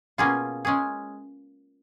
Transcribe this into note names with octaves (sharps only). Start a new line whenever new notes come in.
B2 A#3 C#4 F4 G#4
G#3 C#4 G#4